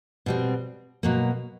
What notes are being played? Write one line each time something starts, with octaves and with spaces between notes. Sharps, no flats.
B2 G3 C4
B2 F#3 A#3